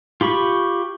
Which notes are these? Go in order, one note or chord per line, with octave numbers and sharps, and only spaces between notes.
F4 G4 B5 C#6